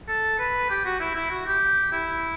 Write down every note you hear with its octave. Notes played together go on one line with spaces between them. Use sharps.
A4
B4
G4
F#4
E4
E4
F#4
G4
E4